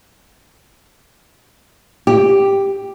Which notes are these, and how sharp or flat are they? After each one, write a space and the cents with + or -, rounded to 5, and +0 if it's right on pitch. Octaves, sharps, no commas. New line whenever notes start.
G4 +5